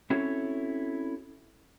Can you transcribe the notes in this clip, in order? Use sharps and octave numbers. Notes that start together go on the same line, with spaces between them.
C4 C#4 E4 F#4 A4 C#5